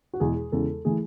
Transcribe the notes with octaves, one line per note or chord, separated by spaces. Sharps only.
F#4
E2 B2 G#3 G#4
E2 C#3 G#3 A4
E3 A3 G#4